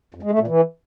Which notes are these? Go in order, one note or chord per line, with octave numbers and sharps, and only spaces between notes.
F2
G#3
A3
A#2
E3